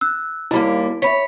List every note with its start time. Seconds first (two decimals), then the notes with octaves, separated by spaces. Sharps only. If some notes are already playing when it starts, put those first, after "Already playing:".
0.01 E6 F#6
0.51 D#2 G3 A#3 E4
1.02 C#5 E5 B5 B6